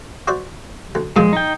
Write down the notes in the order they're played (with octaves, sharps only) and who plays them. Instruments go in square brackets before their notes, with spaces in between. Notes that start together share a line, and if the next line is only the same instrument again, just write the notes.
[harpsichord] F#4 C5 D5
D2
[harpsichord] A#2 C#3 F3 [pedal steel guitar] G#3
[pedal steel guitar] D#4 G5